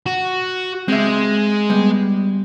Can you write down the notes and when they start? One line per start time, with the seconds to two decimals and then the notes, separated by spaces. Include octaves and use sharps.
0.06 F#4
0.88 G#3 C4 E5
1.70 G3 B3